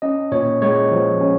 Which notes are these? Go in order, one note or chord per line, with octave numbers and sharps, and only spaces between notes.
C#4 D#5
A#2 C#5
G#3 C#5
F3
C#4